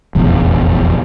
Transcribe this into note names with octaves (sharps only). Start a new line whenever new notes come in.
F1 A#1 E2